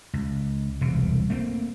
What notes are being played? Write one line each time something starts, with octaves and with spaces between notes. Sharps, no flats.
C#2
E1 C2 C3
A3 A#3 C4